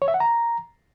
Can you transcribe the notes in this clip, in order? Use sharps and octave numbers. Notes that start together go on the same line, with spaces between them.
C#5
E5
F#5
A#5